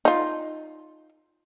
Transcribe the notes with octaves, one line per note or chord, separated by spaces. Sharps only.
D#4 F4